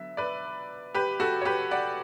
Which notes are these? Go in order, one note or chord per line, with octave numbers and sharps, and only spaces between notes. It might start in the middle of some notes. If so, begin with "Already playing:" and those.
Already playing: D3 F#3 B3 E5
B4 D5
G4 B4
F#4 A4
C#5
G4 B4
D5 F#5